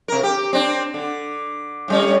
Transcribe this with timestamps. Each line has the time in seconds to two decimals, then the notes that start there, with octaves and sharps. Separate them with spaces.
0.08 C3 A#4
0.23 G4
0.53 C4 D4
0.94 D3
1.88 A2 G3 C#4